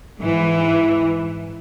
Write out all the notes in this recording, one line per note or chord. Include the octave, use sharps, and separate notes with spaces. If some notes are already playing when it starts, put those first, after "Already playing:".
G#2 E3